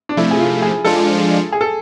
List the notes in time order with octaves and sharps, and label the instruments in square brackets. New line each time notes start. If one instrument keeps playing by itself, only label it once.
[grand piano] D4
[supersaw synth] C3 F3 A3 [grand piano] E4
[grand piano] G#4
F4
G#4
[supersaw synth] F3 G#3 D4 F4 [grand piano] A4
[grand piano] G#4
A4